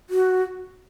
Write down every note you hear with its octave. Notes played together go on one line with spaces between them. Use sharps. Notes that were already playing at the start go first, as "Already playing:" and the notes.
F#4